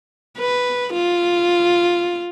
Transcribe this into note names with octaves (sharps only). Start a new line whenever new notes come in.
B4
F4